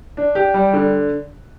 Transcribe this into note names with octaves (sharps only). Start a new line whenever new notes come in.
D4
G4
G3
D3